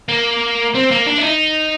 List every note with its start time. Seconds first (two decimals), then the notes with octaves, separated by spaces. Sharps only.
0.09 A#3
0.74 C4
0.91 A#3
1.06 D4
1.18 E4
1.23 D#4